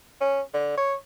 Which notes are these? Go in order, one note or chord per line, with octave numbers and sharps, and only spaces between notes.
C#4
D3
C#5